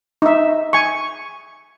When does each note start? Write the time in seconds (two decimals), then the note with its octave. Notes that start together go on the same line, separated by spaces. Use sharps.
0.22 D#4 E5
0.73 G#5 C#6